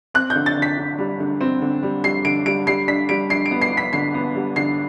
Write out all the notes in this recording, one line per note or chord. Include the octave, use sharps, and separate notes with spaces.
C4 F#6
G6
D3
A6
D3
B6
D3
G3
D3
C4
D3
G3
G3 C7
D3 D7
G3 D7
G3 C7
D4 B6
G3 D7
D4 C7
D7
B3
C7
B3
B6
D3 C7
B3
G3
D3 C7